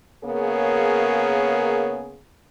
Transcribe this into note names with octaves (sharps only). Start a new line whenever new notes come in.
C#3 A#3 B3 G#4 A#4 C#5